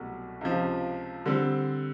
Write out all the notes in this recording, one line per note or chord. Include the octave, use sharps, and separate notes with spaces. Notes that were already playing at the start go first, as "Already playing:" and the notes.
Already playing: C2 B2 F#3 A3
C#2 C3 F3
D3 G3 C4